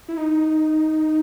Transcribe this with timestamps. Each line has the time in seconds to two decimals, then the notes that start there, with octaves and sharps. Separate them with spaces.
0.09 E4
0.17 D#4